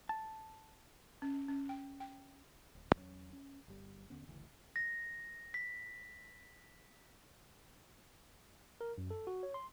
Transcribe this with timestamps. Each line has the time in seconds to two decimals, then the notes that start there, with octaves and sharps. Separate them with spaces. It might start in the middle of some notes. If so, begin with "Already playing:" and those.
0.09 A5
1.22 C#4
1.34 C#4
1.48 C#4
1.69 G5
2.00 G5
2.75 D1
2.94 E2 F#3 A#3 C#4
3.33 C#4
3.68 G1 G3
4.10 D#2 D3 B3 C#4
4.27 G1 D2 C#3 E3
4.76 A#6
5.54 B6
8.81 A#4
8.98 F#2
9.11 A4
9.27 F#4
9.43 C#5
9.54 C6